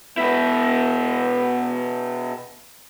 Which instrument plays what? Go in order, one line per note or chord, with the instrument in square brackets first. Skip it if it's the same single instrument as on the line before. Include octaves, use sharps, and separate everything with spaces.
[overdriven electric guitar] B2 E4 [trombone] B3